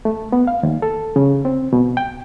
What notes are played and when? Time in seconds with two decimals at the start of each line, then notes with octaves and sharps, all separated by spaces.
0.05 A3
0.32 B3
0.47 F5
0.63 D#2
0.82 A4
1.16 C#3
1.45 C4
1.73 B2
1.97 G5